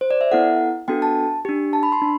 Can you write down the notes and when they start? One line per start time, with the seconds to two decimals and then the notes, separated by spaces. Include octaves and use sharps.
0.01 C5
0.11 D5
0.21 E5
0.32 B3 E4 A4 F#5
0.88 B3 D4 F#4 A4 G5
1.02 A5
1.45 D4 G4
1.73 A5
1.83 B5
1.92 C6
2.02 D4